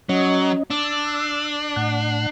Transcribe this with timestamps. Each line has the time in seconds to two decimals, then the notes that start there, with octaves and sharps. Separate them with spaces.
0.09 F#3 C#4 D#5
0.70 D4 E6
1.76 A2 F#5